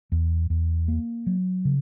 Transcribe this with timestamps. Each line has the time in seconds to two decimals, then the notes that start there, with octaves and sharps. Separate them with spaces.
0.12 E2
0.50 E2
0.88 A#3
1.27 F#3
1.65 C#3